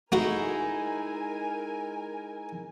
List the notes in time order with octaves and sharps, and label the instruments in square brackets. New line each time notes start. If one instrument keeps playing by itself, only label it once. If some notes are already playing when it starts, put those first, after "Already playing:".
[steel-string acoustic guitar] G#3 D#4 E4 [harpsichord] A3 F#4 [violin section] A#4 G#5